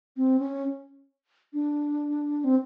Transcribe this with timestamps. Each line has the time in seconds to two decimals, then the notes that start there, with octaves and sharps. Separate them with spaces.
0.17 C4
0.40 C#4
1.53 D4
2.44 C4